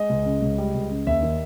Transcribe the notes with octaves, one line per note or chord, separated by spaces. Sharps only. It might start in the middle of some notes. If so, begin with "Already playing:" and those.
Already playing: G#3 D#5
C#2
C#3
C#2
G3
C#2
C#3
D#2 E5
D#3